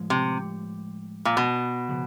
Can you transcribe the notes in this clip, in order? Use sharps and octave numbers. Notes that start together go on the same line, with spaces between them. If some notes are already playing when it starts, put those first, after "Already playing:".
Already playing: A2 F3 G#3
C3
A#2
B2
C#3 F3